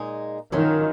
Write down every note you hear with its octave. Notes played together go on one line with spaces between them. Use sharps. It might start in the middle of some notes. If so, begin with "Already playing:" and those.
Already playing: A#2 G#3 D#4 G#4
D#3 F#3 C#4 F4